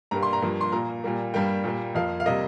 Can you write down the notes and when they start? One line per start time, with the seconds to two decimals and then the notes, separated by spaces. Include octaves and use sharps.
0.11 G2 G3 A#3 A#5
0.23 C6
0.33 A#5
0.42 G2 F3 A#3
0.61 C6
0.72 A#2 A#3 A#5
1.04 A#2 G3 A#3
1.34 G2 G3 A#3 G5
1.64 A#2 G3 A#3
1.95 F2 F3 A#3 F5
2.20 F5
2.26 C3 G3 A#3 D#5